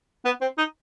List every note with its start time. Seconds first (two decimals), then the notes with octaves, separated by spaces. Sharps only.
0.25 B3
0.41 C4
0.58 D#4